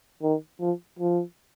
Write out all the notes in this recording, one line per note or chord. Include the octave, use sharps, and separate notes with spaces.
D#3
F3
F3